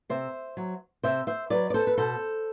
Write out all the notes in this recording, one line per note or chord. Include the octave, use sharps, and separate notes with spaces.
C3 C5 E5
F#3
C3 C5 E5
C5 E5
F#3 B4 D5
D5
A4 C5
B4
B2 A4 C5